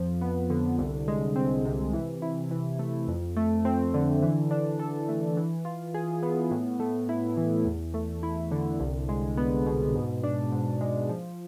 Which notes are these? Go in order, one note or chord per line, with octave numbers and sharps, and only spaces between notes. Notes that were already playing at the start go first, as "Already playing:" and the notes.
Already playing: F2 F3
B3
D3
C2
G#3
C4
C3
E3
E4
E3
A3
F2
A3
C4
D3
E3
D4
A4
A3
E3
F4
G#4
B3
A2
A3
E4
E3
E2
A3
E4
D3
C2
G#3
B3
B2
G#2
D4
G#2
G#3
F3